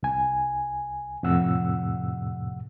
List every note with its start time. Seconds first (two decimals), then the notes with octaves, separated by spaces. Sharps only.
0.03 C2 G#5
1.23 F2 A2 C3 F#5 E6